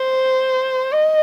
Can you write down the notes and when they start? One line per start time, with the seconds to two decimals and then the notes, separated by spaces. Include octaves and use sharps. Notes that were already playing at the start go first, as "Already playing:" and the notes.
Already playing: C5
0.92 D#5